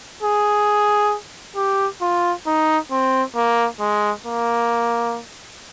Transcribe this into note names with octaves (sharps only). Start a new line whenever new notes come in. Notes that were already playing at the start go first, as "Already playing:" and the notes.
G#4
G4
F4
D#4
C4
A#3
G#3
A#3